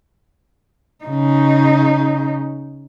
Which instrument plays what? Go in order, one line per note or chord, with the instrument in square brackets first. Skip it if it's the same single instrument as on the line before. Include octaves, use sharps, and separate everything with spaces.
[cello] C#3 D#4